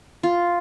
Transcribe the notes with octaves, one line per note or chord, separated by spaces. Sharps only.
F4